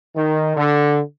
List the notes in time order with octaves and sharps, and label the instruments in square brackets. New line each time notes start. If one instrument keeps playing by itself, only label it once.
[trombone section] D#3
D3